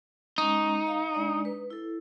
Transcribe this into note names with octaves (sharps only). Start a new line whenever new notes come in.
G#3 C#4 D#4 A#5
F5
G#3 D4 D5
B4
E4 A4